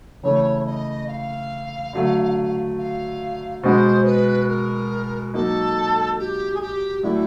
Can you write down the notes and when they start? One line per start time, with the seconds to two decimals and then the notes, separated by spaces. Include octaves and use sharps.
0.23 C#3 E3 A3 C#5
0.66 D#5
1.08 F5
1.93 D3 F#3 A3
2.78 F5
3.63 B2 G#3 B3 C5
4.05 B4
4.48 A#4
5.33 F#3 A#3 D#4 A4
6.19 G4
6.54 G#4
6.61 G4
7.03 A2 F#3 A3 D4 E4